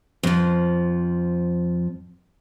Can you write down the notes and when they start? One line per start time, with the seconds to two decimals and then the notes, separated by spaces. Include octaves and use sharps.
0.23 F2 F3